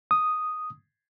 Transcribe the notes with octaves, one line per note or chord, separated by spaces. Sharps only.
D#6